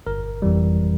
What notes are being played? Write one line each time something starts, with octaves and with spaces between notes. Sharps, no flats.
G1 A#4
F2 E3 G3